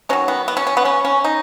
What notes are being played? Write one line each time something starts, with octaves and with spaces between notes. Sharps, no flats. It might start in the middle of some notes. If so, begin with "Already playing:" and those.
D#3 F#3 B3 C#4
B3
B3
C#4
C#4
B3
C#4
C#4
D#4